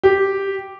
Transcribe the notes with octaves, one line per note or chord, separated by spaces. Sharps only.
G4